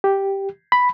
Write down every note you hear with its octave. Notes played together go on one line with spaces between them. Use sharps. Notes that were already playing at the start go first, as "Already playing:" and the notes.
G4
B5